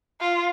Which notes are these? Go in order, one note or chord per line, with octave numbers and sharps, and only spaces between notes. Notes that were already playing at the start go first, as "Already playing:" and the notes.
F4